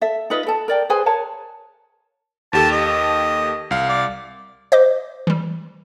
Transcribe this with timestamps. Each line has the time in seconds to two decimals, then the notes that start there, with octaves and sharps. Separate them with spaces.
0.01 A4 E5
0.30 D#4 F4 B4 D#5
0.47 A4 A5
0.68 A#4 D5 G5
0.90 G#4 B4 C5 G#5
1.06 A#4 C#5 A5
2.53 D#2 G4 A4 A5
2.71 D#5
3.71 C2 F5
3.89 D5
4.72 C5 D#5 D6
5.27 E3 G3